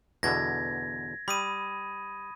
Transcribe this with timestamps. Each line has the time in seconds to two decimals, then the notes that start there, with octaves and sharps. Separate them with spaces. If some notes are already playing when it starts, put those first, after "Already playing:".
0.23 E2 B2 D3 G#6 A#6
1.28 G3 B5 D#6 D#7